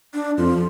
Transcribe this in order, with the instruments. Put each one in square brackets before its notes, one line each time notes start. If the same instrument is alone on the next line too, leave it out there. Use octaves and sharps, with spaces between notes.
[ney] D4
[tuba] F2 [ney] F4